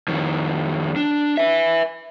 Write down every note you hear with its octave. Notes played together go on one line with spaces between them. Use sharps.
F2 D#3
D4
B4 E5